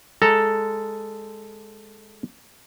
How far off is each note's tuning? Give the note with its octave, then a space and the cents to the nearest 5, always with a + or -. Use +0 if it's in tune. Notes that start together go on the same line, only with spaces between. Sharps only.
G#3 -5 A4 +0 A#5 +0